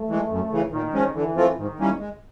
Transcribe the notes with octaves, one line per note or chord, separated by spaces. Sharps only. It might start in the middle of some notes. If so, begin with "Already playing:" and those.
Already playing: A3
E3 G#3
F#2
C#3 E3
A#2 D#3
F3 G#3 C#4
D3 E3
F3 A3 C4 F4
G#2 D#3
E3 G3 A#3 C#4
G#3